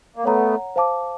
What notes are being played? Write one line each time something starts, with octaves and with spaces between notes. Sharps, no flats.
A#3
A3 B3 C#5 F#5 A#5
C5 F5 A5 D6